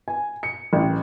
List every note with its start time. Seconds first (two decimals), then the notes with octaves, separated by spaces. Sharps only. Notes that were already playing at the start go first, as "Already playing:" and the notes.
0.08 G#5
0.43 C#7
0.73 A1